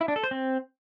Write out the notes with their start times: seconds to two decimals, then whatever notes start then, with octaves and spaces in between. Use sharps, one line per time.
0.01 E4
0.08 D4
0.16 A4
0.24 C5
0.31 C4